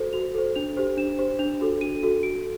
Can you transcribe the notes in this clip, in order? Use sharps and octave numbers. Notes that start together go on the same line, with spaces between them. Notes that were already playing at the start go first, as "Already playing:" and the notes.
Already playing: F#4 A4 C5
F#4 F7
A4 C5
D4 F7
G4 C5
D4 E7
G4 C5
D4 F7
F#4 A4
D4 D#7
F#4 A4
F#4 D7